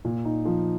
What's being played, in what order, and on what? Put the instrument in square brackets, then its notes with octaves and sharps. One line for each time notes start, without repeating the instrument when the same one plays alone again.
[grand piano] A#2
D#4
F3